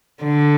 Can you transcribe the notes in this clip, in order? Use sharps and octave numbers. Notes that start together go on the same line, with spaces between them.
D3